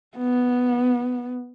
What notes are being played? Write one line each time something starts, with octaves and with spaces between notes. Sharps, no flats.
B3